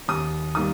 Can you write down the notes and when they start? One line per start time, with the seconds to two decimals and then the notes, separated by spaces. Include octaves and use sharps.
0.08 D#2 D#6
0.55 D#3 G3 A#3 D#6